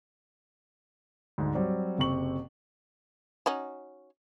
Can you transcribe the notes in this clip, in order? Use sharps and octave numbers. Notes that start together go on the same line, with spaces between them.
D2 G#2
F#3 G3 C4
F#1 C3 C4 C#6 F#7
C#4 D#4 F#4